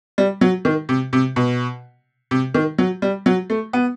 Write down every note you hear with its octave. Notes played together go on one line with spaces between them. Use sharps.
G3
F#3
D#3
C3
C3
B2
C3
D#3
F#3
G3
F#3
A3
B3